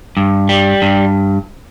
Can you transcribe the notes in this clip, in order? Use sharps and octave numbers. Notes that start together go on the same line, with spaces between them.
G2
G3
G2